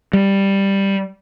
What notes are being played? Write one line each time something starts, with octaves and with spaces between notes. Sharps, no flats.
G3